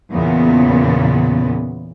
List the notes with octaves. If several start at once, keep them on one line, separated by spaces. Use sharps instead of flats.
E2 A#2 C#3 B3